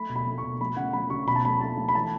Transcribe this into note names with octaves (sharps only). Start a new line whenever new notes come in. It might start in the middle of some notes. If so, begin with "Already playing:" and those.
Already playing: A3 B5
B2
B5
A3
C#6
B2
A3 B5
C#3 F#5
A3 B5
C#3 C#6
B2 B5
A5
A3 B5
A3 A5
A3
B5
E3 A5